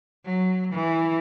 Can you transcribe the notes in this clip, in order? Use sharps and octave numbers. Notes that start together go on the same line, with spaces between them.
F#3
E3